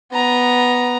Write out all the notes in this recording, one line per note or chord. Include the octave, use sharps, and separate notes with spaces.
B3 A#5